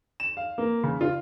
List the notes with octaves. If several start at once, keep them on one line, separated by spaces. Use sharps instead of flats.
E7
F5
A#3
C#3
F4